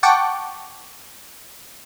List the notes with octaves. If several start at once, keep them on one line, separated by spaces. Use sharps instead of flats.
F#5 G5 A5 C#6 D6